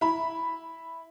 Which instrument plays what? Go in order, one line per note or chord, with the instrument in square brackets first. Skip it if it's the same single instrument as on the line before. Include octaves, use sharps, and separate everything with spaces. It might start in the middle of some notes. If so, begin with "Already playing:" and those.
[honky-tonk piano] E4 B5